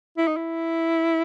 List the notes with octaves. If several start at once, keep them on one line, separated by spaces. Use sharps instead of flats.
E4
D#4
E4